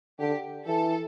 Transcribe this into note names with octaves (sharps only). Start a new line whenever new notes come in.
D3 G4
E3 A4